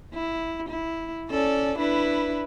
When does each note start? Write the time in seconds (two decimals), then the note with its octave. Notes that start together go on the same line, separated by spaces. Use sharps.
0.14 E4
0.69 E4
1.30 C#4 A4 D5
1.79 D4 E4 B4